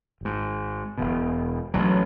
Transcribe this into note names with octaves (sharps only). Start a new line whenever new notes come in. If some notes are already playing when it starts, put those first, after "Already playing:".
G#1 G#2
E1 E2 B2
A1 A2 F#3